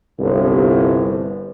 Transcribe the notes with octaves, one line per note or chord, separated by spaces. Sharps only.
G1 C2